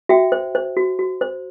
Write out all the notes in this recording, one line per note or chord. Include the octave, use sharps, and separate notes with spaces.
F#4 E5 G5
C5
C5
F#4
F#4
C5